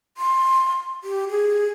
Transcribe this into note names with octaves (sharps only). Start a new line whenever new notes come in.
C6
G4
G#4